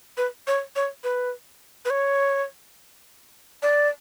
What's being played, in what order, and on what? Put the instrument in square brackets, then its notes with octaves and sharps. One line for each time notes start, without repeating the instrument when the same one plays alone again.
[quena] B4
C#5
C#5
B4
B4
C#5
D5